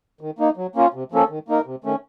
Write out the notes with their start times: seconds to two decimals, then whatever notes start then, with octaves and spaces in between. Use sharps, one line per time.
0.21 D#3
0.39 A#3 D#4
0.57 F#3
0.75 A#3 C#4 F4
0.94 C3
1.12 F3 A#3 C#4 A4
1.29 D#3
1.48 A#3 D#4 A#4
1.66 C3
1.84 D#3 A3 C#4